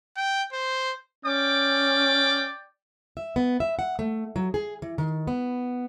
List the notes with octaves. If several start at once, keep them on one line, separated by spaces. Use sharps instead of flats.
G5
C5
C#4 D5 G5 D6
E5
B3
E5
F#5
A3
F#3
G#4
E3
D#3
B3